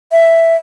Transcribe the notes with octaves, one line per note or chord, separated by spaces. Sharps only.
E5